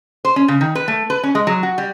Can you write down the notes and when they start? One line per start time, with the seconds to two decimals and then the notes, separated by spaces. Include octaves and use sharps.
0.25 C5
0.36 C#4
0.48 C#3
0.61 D#3
0.75 B4
0.88 A3
1.10 B4
1.23 C#4
1.35 G#3
1.47 F#3
1.63 F#4
1.78 G3